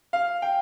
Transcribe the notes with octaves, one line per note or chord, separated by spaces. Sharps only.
F5
G5